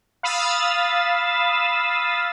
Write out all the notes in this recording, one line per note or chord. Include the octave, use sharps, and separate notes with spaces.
F5 B5 D#6 E6 A6